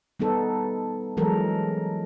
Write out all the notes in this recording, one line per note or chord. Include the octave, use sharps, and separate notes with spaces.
G3 B3 D#4 A4
E3 F#3 G#3 A4 A#4